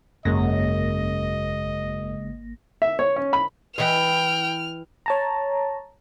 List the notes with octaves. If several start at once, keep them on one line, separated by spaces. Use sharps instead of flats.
G#1 F#2 C#3 G#3 A#3 D#5 A#6
E5
C#5
C#4
B5
E3 D#5 G5 F6
C#5 A5 A#5